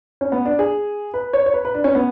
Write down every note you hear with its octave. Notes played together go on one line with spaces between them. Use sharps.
C#4
B3
D4
G#4
B4
C#5
C#5
B4
B4
D4
C#4
B3